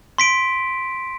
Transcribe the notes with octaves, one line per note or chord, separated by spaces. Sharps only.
C6 B6 D7